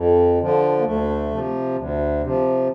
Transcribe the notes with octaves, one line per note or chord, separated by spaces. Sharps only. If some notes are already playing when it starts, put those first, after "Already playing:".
Already playing: F2
D3 F3
A#3
D2 A3
C3 F3
D2
C3 F3